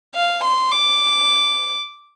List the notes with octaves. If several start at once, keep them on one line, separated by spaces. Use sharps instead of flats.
F5
C6
D6